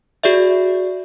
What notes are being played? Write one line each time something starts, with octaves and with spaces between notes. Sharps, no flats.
F#4 G#4 D5 E5